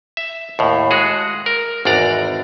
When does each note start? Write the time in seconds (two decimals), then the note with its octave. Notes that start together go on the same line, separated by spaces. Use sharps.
0.17 E5
0.59 D#2 A2
0.91 G#3 F#4 G#4
1.46 A#4
1.85 G#1 E2 D4 D5 A#5